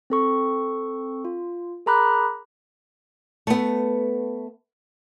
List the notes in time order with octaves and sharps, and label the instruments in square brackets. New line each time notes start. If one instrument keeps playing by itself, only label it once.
[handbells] C4 A4 C#6
F4
G#4 A#4 A#5 B5 D6 F#6
[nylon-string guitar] A3 B3